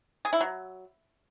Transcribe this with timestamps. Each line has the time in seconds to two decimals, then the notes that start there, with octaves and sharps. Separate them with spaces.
0.25 G#4
0.33 E4
0.41 F#3